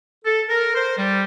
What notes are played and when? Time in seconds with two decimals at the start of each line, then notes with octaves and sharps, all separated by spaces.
0.25 A4
0.49 A#4
0.75 C5
0.97 G3